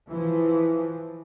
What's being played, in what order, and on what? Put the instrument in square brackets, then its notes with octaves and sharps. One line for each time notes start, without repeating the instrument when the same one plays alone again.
[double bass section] E3 F3